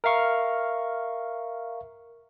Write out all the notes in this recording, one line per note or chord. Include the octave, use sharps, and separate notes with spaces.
A#4 E5 F5 C#6